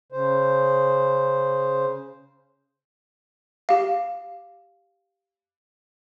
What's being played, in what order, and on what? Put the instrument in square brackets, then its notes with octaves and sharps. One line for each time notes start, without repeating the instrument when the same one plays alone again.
[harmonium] C#3 C5
[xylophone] G4 F5